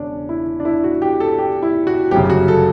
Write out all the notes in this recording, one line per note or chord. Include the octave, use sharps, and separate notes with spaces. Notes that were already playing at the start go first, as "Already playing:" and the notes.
Already playing: E1 C#3 C#4 D4
E4
D4
E4
F#4
G4
A4
G4
E4
F#4
G1 F#2 C#3 G4
F#4
A4